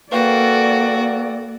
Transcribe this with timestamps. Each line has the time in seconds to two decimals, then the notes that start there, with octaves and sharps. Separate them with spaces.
0.12 A#3 F#4 A4 B4 D5 F5 G5